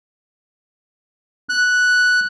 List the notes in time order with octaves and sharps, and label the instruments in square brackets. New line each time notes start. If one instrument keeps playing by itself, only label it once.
[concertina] F#6